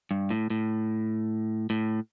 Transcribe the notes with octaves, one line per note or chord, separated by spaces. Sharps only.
G2
A2
A2
A2